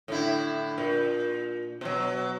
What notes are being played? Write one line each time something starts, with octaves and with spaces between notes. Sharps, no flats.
A2 D3 E4
A#2
B2 F#3